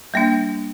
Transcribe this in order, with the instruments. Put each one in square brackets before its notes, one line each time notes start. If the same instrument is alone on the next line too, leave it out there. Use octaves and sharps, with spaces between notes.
[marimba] G3 A#3 D4